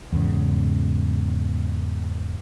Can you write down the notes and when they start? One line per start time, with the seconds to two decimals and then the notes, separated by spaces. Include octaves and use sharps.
0.12 E2 G#2 C#3